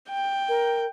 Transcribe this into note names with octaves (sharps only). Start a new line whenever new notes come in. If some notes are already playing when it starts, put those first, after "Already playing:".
G5
A#4